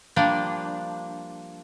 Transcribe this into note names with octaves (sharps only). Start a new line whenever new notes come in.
F3 G3 A#3 D4